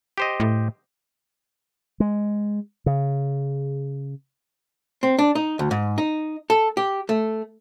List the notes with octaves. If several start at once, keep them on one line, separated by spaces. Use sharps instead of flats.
G4 C5 D#5
A2
G#3
C#3
C4
D4
D#4
D2
G#2
D#4
A4
G4
A3